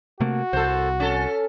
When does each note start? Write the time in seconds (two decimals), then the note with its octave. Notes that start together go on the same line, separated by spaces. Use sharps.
0.20 C3 A3 A#3 F#4
0.53 C2 A4 C5
1.00 C#4 A4